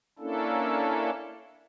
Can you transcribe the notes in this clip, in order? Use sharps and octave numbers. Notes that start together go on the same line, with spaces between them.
A#3 C#4 D4 E4 A4